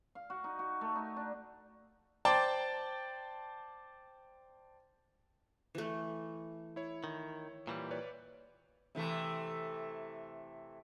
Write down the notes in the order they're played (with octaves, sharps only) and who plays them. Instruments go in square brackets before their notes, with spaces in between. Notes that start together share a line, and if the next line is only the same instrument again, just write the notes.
[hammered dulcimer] F5
F#4
D#4
F#4
A3
D#4
D4
[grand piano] C5 D5 G5 A5
[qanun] E3 A3
[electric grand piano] E4 C#5
[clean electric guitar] D#3
A#2 E3 G3
[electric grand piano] B4 C#5 D5
[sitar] C3 E3 A3